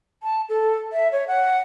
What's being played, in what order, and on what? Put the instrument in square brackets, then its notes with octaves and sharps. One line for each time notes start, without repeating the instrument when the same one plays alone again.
[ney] A5
A4
E5
C#5
F#5